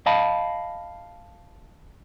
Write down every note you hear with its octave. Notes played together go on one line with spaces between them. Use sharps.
D#5 F5 A5 B5